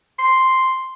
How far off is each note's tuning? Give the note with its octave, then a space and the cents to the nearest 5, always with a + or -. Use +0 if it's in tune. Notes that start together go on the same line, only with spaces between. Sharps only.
C6 +0